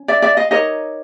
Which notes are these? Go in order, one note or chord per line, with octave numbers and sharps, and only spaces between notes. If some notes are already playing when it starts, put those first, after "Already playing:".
Already playing: C#4
D5 E5
D5 E5
D#5 F5
D#4 G4 A#4 C#5 D#5